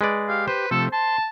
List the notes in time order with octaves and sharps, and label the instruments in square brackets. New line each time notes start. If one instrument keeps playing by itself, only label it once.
[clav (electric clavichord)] G#3 B4 D5
[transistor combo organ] G4 [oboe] F5
[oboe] B4 [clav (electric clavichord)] C5
[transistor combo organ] C3 F3 A3 [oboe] A4
[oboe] A5 [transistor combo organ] C6